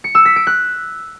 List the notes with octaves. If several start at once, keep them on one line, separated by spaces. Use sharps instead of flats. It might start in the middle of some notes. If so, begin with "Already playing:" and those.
C#7
E6
B6
D7
F#6